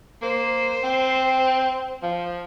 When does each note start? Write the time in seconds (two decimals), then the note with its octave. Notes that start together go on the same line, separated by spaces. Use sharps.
0.22 A#3 C5
0.83 C4
2.03 F3